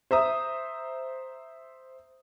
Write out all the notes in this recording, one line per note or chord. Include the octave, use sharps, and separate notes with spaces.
C5 E5 A#5 D#6